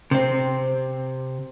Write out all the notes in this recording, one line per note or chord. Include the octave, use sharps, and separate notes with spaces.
C3 C4